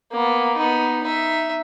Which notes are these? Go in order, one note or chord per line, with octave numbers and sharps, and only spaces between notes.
A#3 B3
B3 D#4
D#4 E5